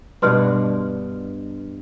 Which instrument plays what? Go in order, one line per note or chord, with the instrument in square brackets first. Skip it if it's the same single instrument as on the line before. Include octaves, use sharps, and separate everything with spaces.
[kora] G2 B2 D4 [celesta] B4 C6 F6